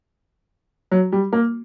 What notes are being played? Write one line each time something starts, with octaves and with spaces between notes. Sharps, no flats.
F#3
G3
A#3